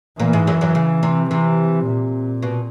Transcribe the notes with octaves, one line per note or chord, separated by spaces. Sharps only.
A#2 E3 A#3
G#2 G#3
F#2 F#3
F#2 F#3
C#3
C3
C3 E3
A#2
B2